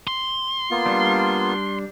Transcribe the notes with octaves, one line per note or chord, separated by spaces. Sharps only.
C6
A#3 B3 F4
G3 D4